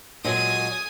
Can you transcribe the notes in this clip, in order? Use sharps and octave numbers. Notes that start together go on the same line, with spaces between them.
A#2 F#3 G#3 G#5 D#6